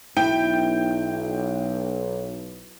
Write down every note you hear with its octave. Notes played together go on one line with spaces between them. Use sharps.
B1 E4 G5